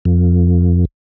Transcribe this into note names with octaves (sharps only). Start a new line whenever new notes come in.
F2